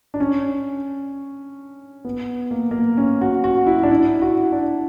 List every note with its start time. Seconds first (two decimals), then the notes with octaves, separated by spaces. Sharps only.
0.14 D4
0.20 C#4
2.05 B3
2.51 A#3
2.71 A#3
2.97 C#4
3.21 F#4
3.44 F#4
3.67 E4
3.83 D4
3.91 E4
4.22 F#4
4.52 D4